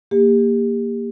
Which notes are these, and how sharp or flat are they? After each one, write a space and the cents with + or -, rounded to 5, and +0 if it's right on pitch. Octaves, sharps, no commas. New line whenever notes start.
A#3 +0 G4 +35